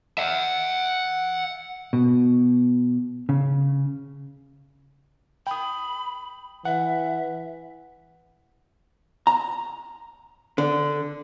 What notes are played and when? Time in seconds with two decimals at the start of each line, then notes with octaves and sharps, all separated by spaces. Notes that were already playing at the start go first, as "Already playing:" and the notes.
0.18 E5 F#5
1.93 B2
3.29 C#3
5.47 G5 B5 D#6
6.65 E3 E5 F#5
9.27 A#5
10.58 D3